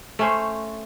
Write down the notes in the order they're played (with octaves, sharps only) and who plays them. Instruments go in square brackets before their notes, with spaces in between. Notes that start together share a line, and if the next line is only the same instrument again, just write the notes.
[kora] A3 C#4 C5